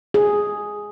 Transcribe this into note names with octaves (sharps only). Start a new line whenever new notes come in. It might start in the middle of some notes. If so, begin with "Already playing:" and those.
G#4